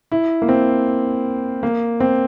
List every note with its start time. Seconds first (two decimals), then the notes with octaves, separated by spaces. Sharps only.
0.12 E4
0.42 A#3
0.48 C4
1.63 A#3
2.00 C4